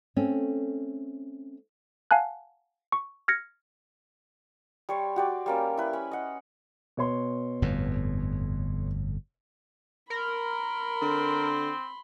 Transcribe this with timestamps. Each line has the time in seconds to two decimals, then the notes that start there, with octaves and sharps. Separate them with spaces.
0.16 A3 C4 C#4
2.11 F5 F#5 G#5 A5 F#6
2.92 C#6
3.28 F6 G#6 A#6 C#7
4.89 G3 C#5 C6
5.16 F#4 G4 D5
5.46 G3 A#3 C#4
5.77 E4 B4
5.93 C#4 B5
6.11 D#5 F#5
6.97 B2 C#5 C6
7.62 G1 F2 A2
10.10 A#4 B5 C6
11.02 D3 C4